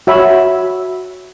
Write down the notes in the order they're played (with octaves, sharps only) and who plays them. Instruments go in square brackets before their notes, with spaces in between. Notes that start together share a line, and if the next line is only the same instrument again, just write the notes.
[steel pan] F#4 C#5 E5 B5